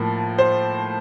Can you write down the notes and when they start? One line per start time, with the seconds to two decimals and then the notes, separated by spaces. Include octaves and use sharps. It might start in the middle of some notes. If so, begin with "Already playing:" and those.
Already playing: A2 F3 A#3
0.38 C5